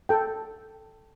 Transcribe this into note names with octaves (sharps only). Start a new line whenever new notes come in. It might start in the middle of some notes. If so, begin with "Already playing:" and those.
A4 G5